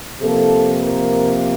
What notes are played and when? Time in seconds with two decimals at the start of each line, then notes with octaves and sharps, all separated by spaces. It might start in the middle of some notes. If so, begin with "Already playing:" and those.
0.21 C3 F3 A#3 A4
0.82 A#4